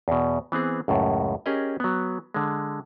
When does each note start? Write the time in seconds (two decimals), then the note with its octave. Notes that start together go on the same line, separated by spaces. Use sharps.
0.08 E2 B2
0.52 E3 B3 C4 G#4
0.88 C#2 F#2 A2
1.46 C#4 G4 G#4 A#4 D#5
1.80 F#3 B3
2.34 D3 G#3